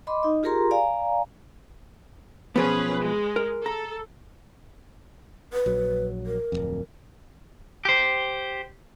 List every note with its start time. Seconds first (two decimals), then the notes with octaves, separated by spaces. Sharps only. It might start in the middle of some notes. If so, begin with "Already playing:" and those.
0.07 D#5 B5 C6 D6
0.23 D#4 D#5
0.43 F4 G4 G#4 A#4 A#5 C6
0.71 D5 F5 G#5 A#5
2.56 B1 F3 B3 C#4 G#4 B4
3.02 G#3
3.36 A#4
3.66 A4 A#5
5.53 B4
5.66 A#1 F#3
6.26 A#4
6.52 D1 G1 F2
7.85 G4 C5